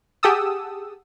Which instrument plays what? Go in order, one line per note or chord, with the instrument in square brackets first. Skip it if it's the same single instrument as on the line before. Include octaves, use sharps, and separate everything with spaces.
[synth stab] G4 G#4 F#5 A5 D#6 E6